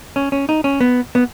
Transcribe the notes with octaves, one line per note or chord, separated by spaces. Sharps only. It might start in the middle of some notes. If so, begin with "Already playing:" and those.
C#4
C#4
D#4
C#4
B3
B3